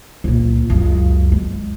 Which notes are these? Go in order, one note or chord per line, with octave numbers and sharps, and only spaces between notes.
C#2 A#2
C#2 F#2
G#3